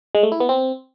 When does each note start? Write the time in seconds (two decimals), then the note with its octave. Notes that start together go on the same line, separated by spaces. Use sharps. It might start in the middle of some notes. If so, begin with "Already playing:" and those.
0.15 G#3
0.23 A3
0.32 E4
0.40 B3
0.49 C4